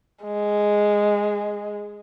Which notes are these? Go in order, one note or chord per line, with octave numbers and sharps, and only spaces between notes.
G#3